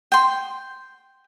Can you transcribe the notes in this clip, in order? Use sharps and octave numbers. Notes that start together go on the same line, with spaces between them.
G5 C6